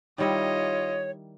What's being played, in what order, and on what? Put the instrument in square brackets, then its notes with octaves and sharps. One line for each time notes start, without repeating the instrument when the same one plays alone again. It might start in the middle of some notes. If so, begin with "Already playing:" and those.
[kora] D#3 G3 E4 [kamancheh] F4 D#5 [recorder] C#5